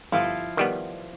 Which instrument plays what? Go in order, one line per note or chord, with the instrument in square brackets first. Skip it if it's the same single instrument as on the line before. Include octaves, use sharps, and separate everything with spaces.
[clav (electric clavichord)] G1 [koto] F3 E4 F4
[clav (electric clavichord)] D#3 G3 B3